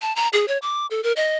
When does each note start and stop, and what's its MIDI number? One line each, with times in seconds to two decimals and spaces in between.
0.02 0.13 81
0.16 0.28 82
0.33 0.45 68
0.48 0.58 73
0.62 0.86 86
0.91 1.01 69
1.03 1.12 70
1.16 1.38 75